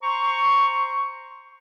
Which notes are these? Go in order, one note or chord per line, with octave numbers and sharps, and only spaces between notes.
C5 A#5 C6 C#6